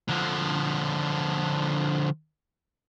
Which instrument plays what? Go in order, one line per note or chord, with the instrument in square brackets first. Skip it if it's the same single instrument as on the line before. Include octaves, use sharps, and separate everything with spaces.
[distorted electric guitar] D3 F3